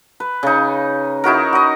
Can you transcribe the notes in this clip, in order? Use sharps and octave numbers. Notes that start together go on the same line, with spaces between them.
B4
C#3 D#4
D#4 E4 F#4 A#4
F#4 D#5